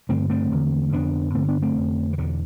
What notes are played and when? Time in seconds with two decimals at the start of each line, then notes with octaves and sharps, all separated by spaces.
0.09 G2 D3 A3 C4
0.30 A3 C4
0.51 E2 D3
0.93 F2 D3 B3 D4
1.34 G2 D3 A3 C4
1.48 B3 D4
1.62 A3 C4
1.77 F2 D3
2.13 E3
2.18 E2 B2 D3